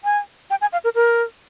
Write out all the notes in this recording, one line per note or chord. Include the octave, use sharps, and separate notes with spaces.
G#5
G5
G#5
F5
A#4
A#4